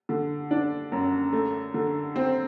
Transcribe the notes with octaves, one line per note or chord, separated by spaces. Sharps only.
D3
D4
F#2
A3
D3
C4